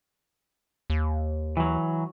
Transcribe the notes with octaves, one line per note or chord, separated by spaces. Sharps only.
D#2
E3 F#3